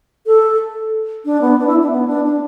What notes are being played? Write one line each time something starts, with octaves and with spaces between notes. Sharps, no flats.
A4
D4
B3
D4
E4
D4
B3
D4
D4